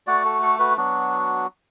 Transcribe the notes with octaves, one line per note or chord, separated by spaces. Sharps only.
A3 F#4 D5 F#5
A4
A4
F#4 B4
F#3 B3 D4 F#4